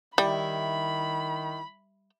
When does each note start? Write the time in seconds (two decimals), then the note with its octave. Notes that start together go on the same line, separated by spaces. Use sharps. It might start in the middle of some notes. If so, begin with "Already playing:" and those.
0.18 D#3 G3 E4 B5